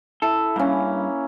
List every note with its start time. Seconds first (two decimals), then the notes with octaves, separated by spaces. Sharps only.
0.22 E4 A4
0.56 G2 A#3 C#4